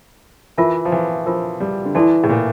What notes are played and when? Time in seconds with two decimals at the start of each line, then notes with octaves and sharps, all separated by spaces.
0.58 E3 F4 A#4 E5 A5
0.85 F3
0.92 E3
1.26 F3 D4 F4 A#4
1.60 G3
1.85 D3
1.95 E3 E4 A4 D5 A5 C6
2.24 A2
2.30 A#2